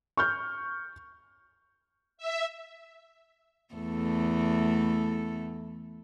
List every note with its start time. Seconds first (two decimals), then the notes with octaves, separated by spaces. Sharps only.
0.17 C#6 F6 G6
2.17 E5
3.75 E2 A3 A4